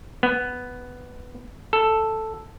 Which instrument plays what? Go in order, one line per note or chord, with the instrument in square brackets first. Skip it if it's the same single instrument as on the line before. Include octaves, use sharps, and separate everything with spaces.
[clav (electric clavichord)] B3
A4